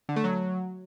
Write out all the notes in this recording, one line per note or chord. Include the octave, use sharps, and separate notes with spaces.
D3
A3
F#3